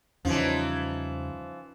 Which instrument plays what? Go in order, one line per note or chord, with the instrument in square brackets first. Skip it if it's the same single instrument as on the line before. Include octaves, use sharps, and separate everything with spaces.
[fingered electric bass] E2 C#3 G3 [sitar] E3 F3 [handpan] C#4 D#4 F4